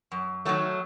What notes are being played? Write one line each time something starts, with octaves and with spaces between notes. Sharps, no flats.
F#2
D#3 F#3 A3